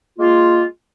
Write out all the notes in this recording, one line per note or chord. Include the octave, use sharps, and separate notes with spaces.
G#3 A#3 F4